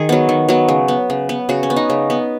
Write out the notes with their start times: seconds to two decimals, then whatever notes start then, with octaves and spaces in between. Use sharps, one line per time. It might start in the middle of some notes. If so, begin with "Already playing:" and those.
Already playing: D#3 G#4
0.09 F#3 B3
0.29 D#3
0.49 F#3 B3
0.68 C#3
0.88 B3
1.10 C#3
1.29 B3
1.49 C#3 F#4
1.63 C#4
1.70 B3
1.76 D#4
1.90 C#3
2.10 B3